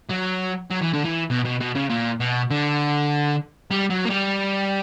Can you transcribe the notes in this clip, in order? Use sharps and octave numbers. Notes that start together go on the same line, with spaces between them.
F#3
F#3
E3
D3
E3
B2
B2
B2
C#3
A#2
B2
D3
G3
F#3
A#3
G3